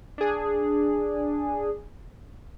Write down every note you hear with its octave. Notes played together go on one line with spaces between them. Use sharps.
D4 G#4